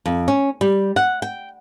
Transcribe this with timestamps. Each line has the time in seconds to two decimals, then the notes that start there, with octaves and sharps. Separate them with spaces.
0.06 F2
0.28 C#4
0.61 G3
0.96 F#5
1.22 G5